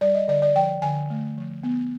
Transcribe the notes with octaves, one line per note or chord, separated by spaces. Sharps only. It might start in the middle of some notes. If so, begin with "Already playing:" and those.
G3 D5
D#5
D3 D5
D5
F3 G5
D3 G#5
A3
F3
B3